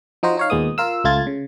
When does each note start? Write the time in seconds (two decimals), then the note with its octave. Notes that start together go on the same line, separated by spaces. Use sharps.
0.23 F3 D#4 F#4 C5 D#5
0.37 D#4 C#5 F5
0.50 D#2 A#2 G#3 B3 D#6
0.78 F4 A#4 F5 E6
1.04 C#2 A3 F4 G#6 A6
1.27 C#3